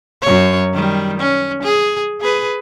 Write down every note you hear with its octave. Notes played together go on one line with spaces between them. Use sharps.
F#2 C#5
D#3 G3
C#4
G#4
G#4 B4